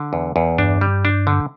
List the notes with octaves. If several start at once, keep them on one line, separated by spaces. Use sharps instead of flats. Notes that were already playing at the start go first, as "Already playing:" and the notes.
Already playing: D3
E2
E2
G2 D4
G3
D4
D3